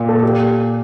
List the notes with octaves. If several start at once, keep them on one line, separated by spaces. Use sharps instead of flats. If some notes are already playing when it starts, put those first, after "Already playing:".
Already playing: A#2
A4
A#2 G4